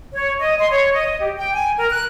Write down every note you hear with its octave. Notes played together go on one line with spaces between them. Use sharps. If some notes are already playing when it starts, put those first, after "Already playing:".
C#5
D#5
C6
C#5
D#5
G4
G5
G#5
A#4
F#6